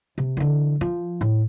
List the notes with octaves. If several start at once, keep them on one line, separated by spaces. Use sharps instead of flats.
C3
D3 E3
F3
A2